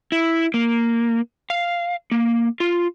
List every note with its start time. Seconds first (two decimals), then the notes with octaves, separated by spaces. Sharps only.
0.12 E4
0.54 A#3
1.50 F5
2.11 A#3
2.60 F4